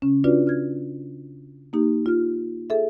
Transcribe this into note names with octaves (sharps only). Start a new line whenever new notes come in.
C#3 C#4
D4 F4 F#4 B4 D5
F6 G#6
A#3 D#4 G4
F4 F6
G#4 A4 E5